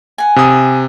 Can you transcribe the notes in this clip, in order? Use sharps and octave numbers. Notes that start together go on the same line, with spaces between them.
F#5 G#5
C3 D#6